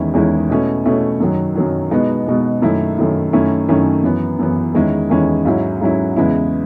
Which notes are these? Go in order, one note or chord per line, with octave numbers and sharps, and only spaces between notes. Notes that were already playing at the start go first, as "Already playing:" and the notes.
Already playing: E2 D#3 G#3 C#4 E4
E2 D#3 G#3 C#4 E4
B2 A3 C#4 E4
B2 A3 C#4 E4
F#2 D#3 F#3
F#2 D#3 F#3
B2 G#3 B3 D#4
B2 G#3 B3 D#4
F#2 D#3 A3 E4
F#2 D#3 A3 E4
F#2 D#3 A3 C#4 E4
F#2 D#3 A3 C#4 E4
F#2 E3 B3
F#2 E3 B3
E2 D#3 G#3 C#4 E4
E2 D#3 G#3 C#4 E4
G#2 F#3 C#4 E4
G#2 F#3 C#4 E4
E2 C#3 G#3 B3 E4